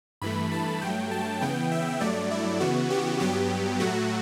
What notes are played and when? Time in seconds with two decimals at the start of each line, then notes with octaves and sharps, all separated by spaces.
0.22 G2 E3 A3 B5
0.52 A5
0.82 G2 F#3 A3 G5
1.11 A5
1.41 C#3 E3 B3 G5
1.72 E5
2.01 G2 F#3 A3 D5
2.31 E4
2.60 C#3 E3 B3 F#4
2.90 G4
3.20 G2 F#3 B3 G4
3.80 A2 F#3 A3 F#4